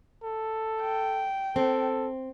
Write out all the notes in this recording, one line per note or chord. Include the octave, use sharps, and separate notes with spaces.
A4
G5
C4 A4